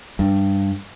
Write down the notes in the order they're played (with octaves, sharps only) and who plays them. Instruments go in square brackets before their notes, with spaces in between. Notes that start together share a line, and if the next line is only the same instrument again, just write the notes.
[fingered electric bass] G2